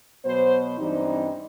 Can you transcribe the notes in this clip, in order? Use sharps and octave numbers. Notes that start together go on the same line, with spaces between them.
B2 F#3 B3 C5
G2 E3 G3 C4 D#4